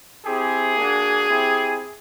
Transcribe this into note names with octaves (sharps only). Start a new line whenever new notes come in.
C4 E4 G4 G#4
A#3 D4 F#4
C4 E4 G4